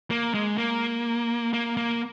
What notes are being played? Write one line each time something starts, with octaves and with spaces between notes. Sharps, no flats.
A#3
G#3
A#3
A#3
A#3